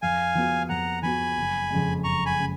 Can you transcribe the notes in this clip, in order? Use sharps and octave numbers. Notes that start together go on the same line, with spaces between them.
F2 F5 G#5
F3 B3 F#4
F2 F#5 A#5
F3 B3 F#4 G#5 B5
F#1
F2 C#3 G#3
F#1 A#5 C#6
G#5 B5
C#3 G#3